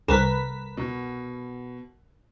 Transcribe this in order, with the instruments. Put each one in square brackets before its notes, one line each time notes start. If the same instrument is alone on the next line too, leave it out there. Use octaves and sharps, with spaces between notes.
[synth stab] C2 B4 B6 [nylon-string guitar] A#4 [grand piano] E7
[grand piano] B2